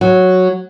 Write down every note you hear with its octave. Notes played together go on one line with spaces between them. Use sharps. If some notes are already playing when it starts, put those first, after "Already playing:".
F#3